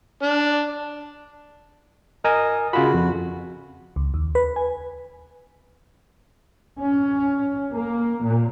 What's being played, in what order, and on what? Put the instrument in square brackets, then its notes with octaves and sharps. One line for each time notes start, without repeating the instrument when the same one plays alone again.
[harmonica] D4
[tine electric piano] A#4 G#5 [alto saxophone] D#5
[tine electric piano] C#3 F4 B5 [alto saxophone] F#4
[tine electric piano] F2
[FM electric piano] C#2
D#2
B4
G#5
[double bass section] C#4
A#3
A#2